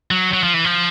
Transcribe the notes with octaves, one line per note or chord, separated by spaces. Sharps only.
F#3
F#3
F3
E3
F3